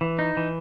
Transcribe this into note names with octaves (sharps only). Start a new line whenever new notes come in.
E3
D#4
E3